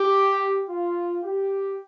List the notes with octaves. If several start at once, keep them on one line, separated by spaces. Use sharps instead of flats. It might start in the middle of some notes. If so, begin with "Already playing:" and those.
Already playing: G4
F4
G4